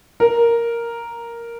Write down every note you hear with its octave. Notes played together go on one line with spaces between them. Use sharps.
A#4